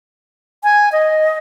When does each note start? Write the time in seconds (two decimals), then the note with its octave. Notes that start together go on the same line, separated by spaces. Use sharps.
0.64 G#5
0.92 D#5